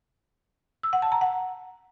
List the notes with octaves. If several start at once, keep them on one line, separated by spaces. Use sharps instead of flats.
E6
F#5
A5
A#5
F#5